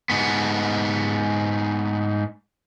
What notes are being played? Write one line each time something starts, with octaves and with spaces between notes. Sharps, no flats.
G#2 B3